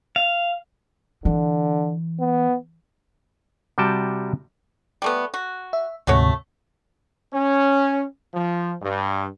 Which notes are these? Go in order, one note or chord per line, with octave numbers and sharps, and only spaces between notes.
F5
D3 E3
B3
C3 G3 F#4 G5 A5
G3 A3 B3
F#4
E5
D2 G#2 C3 A3 F#4 C#5
C#4
F3
G2